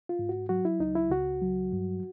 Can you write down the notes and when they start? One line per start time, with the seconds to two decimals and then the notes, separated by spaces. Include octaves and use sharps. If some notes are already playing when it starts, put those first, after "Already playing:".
0.09 F4
0.19 G#2
0.29 F#4
0.49 F#3 F#4
0.65 E4
0.80 C#2 D#4
0.95 E4
1.11 C#2 F#4
1.42 F#3
1.72 G2